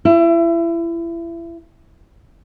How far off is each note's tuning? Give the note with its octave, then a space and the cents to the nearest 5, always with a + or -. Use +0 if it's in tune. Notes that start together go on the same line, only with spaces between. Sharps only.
E4 +30